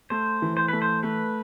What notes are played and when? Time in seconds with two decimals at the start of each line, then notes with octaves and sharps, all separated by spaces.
0.10 A3 C5
0.42 E3
0.57 C5
0.68 A3 B4
0.82 C5
1.03 A3 B4